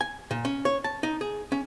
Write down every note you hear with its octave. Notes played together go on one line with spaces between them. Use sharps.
G#5
A#2
C#4
C#5
A5
D#4
G#4
C#4